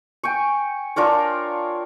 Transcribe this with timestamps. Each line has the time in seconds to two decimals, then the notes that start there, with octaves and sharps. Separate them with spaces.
0.23 G5 G#5 C#6
0.96 D4 F4 A#4 C#5